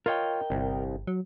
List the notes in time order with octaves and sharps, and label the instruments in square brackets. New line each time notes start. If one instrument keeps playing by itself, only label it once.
[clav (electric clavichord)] F4 C#5 [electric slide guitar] A#4 D#5 G5
[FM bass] G1 [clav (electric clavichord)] C2
[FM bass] F#3